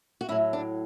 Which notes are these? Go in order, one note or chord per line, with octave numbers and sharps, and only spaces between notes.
F#4
A2 F#3 E4
D4